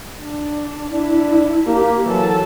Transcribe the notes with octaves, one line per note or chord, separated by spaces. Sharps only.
D4
D4 E4
A#3 G4
E3 F#3 A4